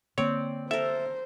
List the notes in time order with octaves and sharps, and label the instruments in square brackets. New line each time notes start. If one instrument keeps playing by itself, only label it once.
[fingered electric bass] D3 A#3 [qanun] C4 D5 [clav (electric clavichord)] C#5
[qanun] A4 A#4 [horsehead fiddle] C5 [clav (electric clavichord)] E5